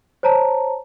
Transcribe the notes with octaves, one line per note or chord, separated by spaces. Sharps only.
C5 C#5 A5 A#5